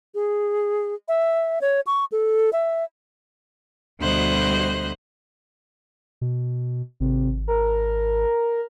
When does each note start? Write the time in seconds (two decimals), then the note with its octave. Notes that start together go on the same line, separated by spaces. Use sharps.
0.15 G#4
1.08 E5
1.61 C#5
1.87 C#6
2.12 A4
2.53 E5
4.00 D2 B2 G3 C5 D#5 F#6
6.21 B2
7.00 G#1 C3
7.48 A#4